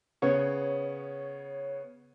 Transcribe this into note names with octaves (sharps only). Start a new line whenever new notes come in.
C#3 B3 C#5